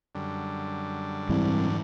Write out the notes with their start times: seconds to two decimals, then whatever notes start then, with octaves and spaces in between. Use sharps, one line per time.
0.15 F#2 D3 G3
1.29 C2 G#2 E3